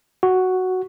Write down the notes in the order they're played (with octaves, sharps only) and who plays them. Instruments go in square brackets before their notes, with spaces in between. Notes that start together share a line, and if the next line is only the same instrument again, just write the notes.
[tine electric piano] F#4